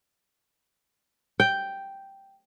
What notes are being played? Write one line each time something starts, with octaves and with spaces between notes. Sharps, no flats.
G5